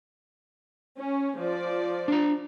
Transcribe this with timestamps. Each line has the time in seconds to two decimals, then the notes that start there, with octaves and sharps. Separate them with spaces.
0.98 C#4
1.38 F3 D5
2.08 D4 A#5